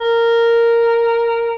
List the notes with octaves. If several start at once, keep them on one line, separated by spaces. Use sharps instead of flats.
A#4